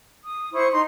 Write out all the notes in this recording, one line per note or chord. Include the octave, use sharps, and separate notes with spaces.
D#6
E4 C5 C#6 D#6
D#4 C6